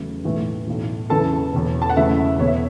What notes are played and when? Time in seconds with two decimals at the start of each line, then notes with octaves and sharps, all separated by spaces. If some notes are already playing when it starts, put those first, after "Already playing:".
Already playing: E2 C#3 F#3 A3
0.24 B1 A2 E3 A3
0.68 B1 A2 E3
1.10 F#1 E2 C#3 E3 A4 A5
1.53 E1 E2 B2
1.82 A5
1.90 F#5
1.96 F#1 E2 C#3 A3 E4 E5
2.39 E2 B2 B3 C#5
2.47 E5